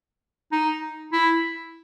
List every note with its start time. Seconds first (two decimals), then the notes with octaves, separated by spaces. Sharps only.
0.52 D#4
1.13 E4